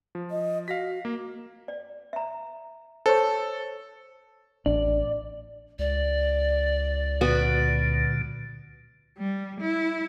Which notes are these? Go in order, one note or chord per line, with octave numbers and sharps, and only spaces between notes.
F3
D#5
F#4 F5 A#6 B6
A#3
D5
E5 A#5
A4 C5 C#5 C#6
A1 D4 D5
C#2 D5
A#2 D3 B3 F#4
G3
E4